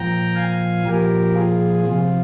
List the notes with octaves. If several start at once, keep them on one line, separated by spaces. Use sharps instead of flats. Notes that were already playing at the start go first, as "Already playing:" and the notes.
Already playing: A#2 F3 G5 A#5
F5 G#5
A#2 F3 G4 A#4
F4 G#4
C3 F3 F4